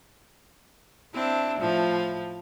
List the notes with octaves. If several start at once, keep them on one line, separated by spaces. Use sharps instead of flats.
C4 D4 E4
A2 F3